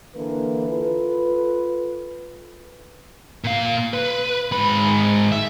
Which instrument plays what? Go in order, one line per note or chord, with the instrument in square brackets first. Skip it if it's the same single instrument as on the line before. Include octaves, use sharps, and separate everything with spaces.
[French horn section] D3 E3 A#3 B4
F4 A4 B4
[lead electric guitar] A#2 F5
B4
G#2 B5
E5